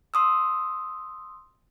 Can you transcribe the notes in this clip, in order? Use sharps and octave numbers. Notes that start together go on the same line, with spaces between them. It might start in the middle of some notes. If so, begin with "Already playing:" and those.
C6 D#6 E6